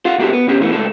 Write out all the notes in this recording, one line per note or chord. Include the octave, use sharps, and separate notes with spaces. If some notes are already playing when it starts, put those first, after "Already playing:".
F4 F5 F#5
C3 A#3 F#4 G4 A4
B3
B2 C#4 G4
A#2 E3 A3 B3
C#2 A3 A4